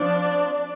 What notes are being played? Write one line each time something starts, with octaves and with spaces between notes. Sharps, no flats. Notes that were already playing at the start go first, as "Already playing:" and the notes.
Already playing: F3 C4 D4 D5